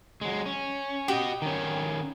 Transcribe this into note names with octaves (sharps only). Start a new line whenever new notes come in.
F#3 G#3
C#4
F#4 G4 D#5
D#3 C#4